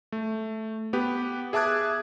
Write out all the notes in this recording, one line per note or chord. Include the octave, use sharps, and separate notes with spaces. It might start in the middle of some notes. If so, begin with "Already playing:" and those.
A3
B3 G4 B4
G#4 E5 A5 D6 F#6 G#6